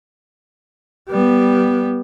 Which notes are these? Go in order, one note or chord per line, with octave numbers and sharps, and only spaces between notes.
G3 B3